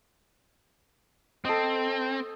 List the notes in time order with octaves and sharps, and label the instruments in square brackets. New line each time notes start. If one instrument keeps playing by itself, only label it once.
[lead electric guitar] C4 [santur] A4 D#5